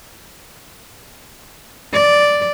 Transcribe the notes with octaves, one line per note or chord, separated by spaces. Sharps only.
D5